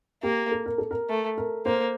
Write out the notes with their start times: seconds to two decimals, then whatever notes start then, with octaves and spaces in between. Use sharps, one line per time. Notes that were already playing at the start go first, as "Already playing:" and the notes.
0.23 A#3 G4
0.52 A4
0.66 A#4
0.78 A4
0.91 A#4
1.09 A3
1.38 A#4
1.66 A#3 C5